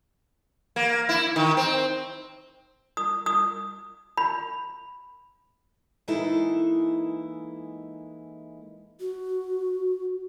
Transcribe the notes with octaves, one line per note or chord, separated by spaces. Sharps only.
A#3
E4
D#3
C4
D#6
D#6
B5
E3 G#3 A#3 D#4 E4 A4
F#4